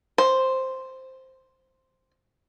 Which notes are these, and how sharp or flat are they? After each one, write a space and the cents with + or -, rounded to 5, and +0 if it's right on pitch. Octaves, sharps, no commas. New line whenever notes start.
C5 +0